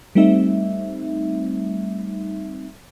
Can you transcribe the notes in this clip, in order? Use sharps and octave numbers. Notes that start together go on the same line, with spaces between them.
G3 A3 C4 D#4 E5